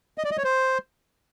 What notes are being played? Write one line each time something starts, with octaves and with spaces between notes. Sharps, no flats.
D#5
D5
D#5
C#5
C5